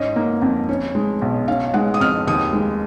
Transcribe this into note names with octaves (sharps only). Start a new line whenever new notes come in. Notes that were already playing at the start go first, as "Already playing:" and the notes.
Already playing: G#2 C#4 D#5
A#3
F2
C#4
G#3
B1
C#4 F5
G#3 F#5
D#6
F2 F6
D#2 D#6
G#3